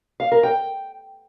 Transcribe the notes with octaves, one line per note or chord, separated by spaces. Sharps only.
F5
A#4
G5